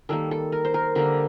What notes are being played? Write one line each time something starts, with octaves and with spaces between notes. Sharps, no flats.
D#3 G3 A#3 A4
A4
A#4
C5
A#4
D3 G3 A#3 A#4